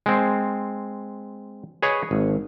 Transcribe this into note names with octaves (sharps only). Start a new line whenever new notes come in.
G#3 C4
G#4 B4 C#5 D#5
G#1